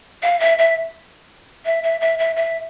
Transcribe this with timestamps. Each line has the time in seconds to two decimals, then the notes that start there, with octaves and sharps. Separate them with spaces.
0.23 F5
0.40 E5
0.59 E5
1.65 E5
1.83 E5
2.01 E5
2.19 E5
2.36 E5